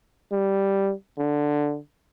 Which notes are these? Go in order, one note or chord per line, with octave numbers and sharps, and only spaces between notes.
G3
D3